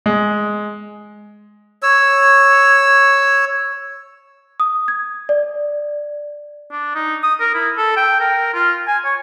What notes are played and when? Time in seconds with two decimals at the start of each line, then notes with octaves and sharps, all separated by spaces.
0.06 G#3
1.83 C#5 E6
4.60 D#6
4.88 G#6
5.29 D5
6.71 D4
6.95 D#4
7.23 D#6
7.40 A#4
7.54 E4
7.77 A4
7.97 G5
8.20 A#4
8.54 F4
8.87 G#5
9.05 C#5